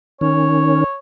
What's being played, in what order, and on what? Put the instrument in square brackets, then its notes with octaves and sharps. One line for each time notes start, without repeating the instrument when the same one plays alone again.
[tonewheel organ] D#3 C#4 [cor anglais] C#5